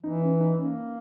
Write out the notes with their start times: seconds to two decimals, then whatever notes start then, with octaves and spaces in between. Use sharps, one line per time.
0.03 E3 D#4
0.21 C#4
0.40 D#4
0.57 A#3 C#4